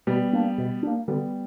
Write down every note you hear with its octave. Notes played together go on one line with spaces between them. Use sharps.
B2 G3 B3
A#3 D4
B2
A#3 D4
D3 G3 B3